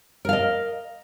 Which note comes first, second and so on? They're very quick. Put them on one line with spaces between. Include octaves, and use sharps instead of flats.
A#4 F5 D#5